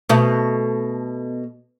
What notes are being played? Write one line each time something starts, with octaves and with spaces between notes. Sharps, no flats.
B2 A3